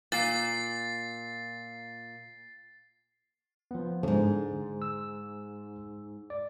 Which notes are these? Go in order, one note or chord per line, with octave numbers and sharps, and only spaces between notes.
A#2 A6 C7
F3 B3
F2 G#2 D3
E6
D5